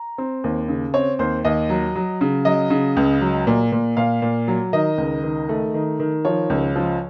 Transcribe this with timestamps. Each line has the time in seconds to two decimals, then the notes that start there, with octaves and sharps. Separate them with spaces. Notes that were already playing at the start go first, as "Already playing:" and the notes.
Already playing: A#5
0.18 C4
0.44 D#2
0.68 C#3
0.94 C4 C#5
1.19 D#2 C5
1.45 D#2 D#5
1.70 F#3
1.95 F#3
2.21 C#3
2.45 F#3 D#5
2.70 C#3
2.97 C#2
3.21 F#3
3.47 A#2
3.72 A#2
3.97 A#2 F5
4.22 A#2
4.48 F#3
4.73 D#3 D#5
4.98 C#2
5.23 D#3
5.49 A3
5.74 D#3
6.00 D#3
6.25 F3 C#5
6.50 C#2
6.76 F3